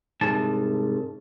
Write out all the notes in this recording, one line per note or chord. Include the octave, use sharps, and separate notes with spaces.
C2 G#2 A5